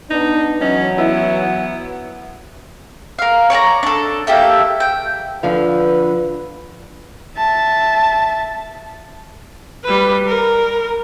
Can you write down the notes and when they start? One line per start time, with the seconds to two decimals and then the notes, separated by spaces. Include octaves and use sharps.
0.10 B3 D4 D#4
0.61 E3 F#3 C#4 D#5
0.98 B3 E4
3.19 A#4 F5
3.50 C#5 D5 A5 A#5
3.83 D4 A4
4.27 A#3 G4 A4 E5
4.80 G5
5.43 D3 F3 B4 F5
7.37 E5 A5
9.84 G3 B4
10.27 A#4